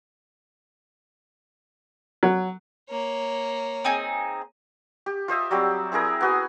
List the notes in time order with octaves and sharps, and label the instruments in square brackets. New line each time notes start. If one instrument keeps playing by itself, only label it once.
[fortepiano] F#3
[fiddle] A#3 C#5
[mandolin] C4 D#4 G#4
[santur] G4
F4 C5 D#5 E5
F#3 G3 C4
C4 E4 G#4 A#4
B3 F#4 G#5